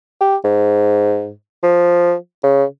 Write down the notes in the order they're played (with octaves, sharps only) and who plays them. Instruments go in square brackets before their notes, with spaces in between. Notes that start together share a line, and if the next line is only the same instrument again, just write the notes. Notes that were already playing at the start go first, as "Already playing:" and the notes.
[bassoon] G4
G#2
F3
C#3